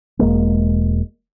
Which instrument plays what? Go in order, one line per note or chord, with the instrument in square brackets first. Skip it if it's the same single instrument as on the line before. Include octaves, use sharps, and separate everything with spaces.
[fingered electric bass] E1 G#2 G#3 A#3